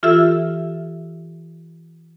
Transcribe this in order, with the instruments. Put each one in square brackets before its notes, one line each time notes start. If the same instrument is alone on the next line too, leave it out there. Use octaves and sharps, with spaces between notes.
[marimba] E3 F4 G4 A4 E5 E6